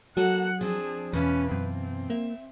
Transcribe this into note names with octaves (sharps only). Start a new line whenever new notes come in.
F#3 A#3 F#4 A4 F#5
F3 C4 D4 G#4
E2 B2 E3 C#4 F4 B4
F#2 C4
A#3 E5